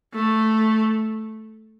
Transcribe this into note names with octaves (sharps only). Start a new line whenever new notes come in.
A3